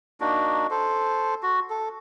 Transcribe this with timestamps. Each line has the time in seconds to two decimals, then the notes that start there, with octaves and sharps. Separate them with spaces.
0.21 A#3 D4 D#4 F#4
0.71 A4 C5
1.43 F#4
1.70 A4